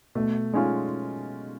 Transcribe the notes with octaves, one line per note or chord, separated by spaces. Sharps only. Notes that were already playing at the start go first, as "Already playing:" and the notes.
B2 A3
G#3 C#4 F4